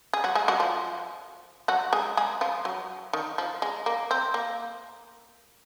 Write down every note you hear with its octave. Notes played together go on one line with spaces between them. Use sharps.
G#4
F#3 F#4
G#3 G#4
F#3 F#4
F3 F4
F#3 F#4
G#3 G#4
G#3 G#4
F3 F4
F#3
D#3
F3
G#3
A#3
C4
A#3